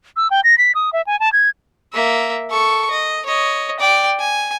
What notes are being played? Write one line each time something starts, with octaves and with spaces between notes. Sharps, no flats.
E6
G5
A#6
B6
D#6
E5
G#5
A5
G#6
A#3 E5
A4 C#6
D#5
C#5 D#5
D5 G5
G#5